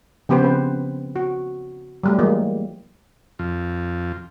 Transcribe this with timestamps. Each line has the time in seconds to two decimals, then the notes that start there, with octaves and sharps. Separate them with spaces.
0.29 C#3 F3 B3 G4 B4 C5
0.43 F3 C4 B4
1.16 F#4
2.03 F#3 G3 A3
2.19 E3 F#3 G#3 A#3
3.39 F2